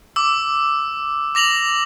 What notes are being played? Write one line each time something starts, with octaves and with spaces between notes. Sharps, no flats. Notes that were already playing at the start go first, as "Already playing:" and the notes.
D6 E6
D6 A#6 F7 F#7